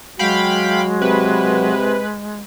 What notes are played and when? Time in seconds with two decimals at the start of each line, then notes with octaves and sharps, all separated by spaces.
0.19 F#3 G#3 F#4 F5 G5 B5
1.02 C3 B4